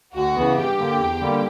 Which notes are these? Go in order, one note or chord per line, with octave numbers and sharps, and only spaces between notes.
D2 F#4
C#3 E3 B3
G2 G4
D3 A#3
E2
D3 G3 A#3